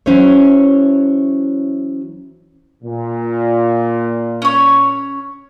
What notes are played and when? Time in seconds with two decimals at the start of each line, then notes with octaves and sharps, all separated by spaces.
0.06 E3 F#3 C#4 E4 C5 C#5
2.83 A#2
4.42 C#4 C#5